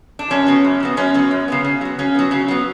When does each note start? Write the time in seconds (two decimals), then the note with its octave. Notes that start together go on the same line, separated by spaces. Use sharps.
0.19 D4
0.30 F#2 C#4
0.47 C#3 F#3 B3
0.65 F#2
0.80 C#3 F#3 B3
0.97 F#2 C#4
1.14 C#3 F#3 B3
1.31 F#2
1.48 C#3 F#3 B3
1.64 C#3
1.81 F#3 B3
1.98 C#3 C#4
2.15 F#3 B3
2.31 C#3 C#4
2.48 F#3 B3